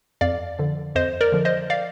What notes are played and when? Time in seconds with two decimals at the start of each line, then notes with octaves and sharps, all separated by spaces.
0.21 F2 D5 F5
0.59 D3 F3
0.95 F2 C5 D#5
1.21 A#4 D5
1.32 D3 F3
1.45 C5 D#5
1.70 D5 F5